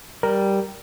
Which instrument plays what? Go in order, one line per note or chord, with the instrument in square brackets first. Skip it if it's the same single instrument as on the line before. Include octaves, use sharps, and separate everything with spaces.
[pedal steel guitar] G3 [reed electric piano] A#4